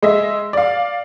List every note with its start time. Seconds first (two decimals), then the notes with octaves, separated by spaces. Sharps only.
0.02 G#3 D#5 E5
0.53 D5 F5